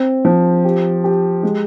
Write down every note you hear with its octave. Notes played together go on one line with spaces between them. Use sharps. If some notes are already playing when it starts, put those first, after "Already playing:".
Already playing: C4
F3
G4
G4
G#3